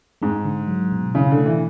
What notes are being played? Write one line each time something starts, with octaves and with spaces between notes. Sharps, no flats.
G#2 G#3
D3
F#3
B2
C#3 E4
D3
A3
E3